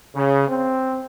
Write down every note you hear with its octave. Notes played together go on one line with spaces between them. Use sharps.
C#3
C4